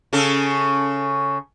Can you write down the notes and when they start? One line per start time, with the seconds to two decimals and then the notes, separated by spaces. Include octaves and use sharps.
0.13 C#3 C#4 A4